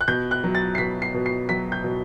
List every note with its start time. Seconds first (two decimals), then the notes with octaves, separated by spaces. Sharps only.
0.01 F#6
0.08 B2 G6
0.31 F#6
0.44 F#3
0.55 A6
0.75 C7
0.78 B2 B6
1.02 C7
1.14 B2
1.26 C7
1.49 F#3 B6
1.72 G6
1.84 B2